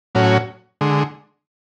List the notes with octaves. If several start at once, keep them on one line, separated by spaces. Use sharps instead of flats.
A2 F#3 C#4 F#4
D3 G#3